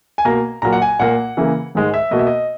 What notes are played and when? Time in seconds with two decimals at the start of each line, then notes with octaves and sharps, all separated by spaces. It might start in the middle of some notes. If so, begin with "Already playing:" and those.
0.18 G#5
0.25 B2 A#3 A#5
0.62 A#2 F#3 A#3 A#5
0.73 F#5
0.82 G#5
0.99 A#2 A#3 F#5
1.37 C#3 E3 A#3
1.75 G#2 D#3 G#3
1.94 E5
2.11 B2 A#3 D#5
2.19 E5
2.27 D#5